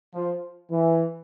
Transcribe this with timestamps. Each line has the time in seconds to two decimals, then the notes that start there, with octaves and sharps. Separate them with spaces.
0.14 F3
0.70 E3